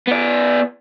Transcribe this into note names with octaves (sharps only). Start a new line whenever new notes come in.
B3 D5